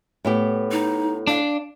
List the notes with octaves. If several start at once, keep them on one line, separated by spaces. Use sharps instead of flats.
A2 B3 G4
D#4
D4 F5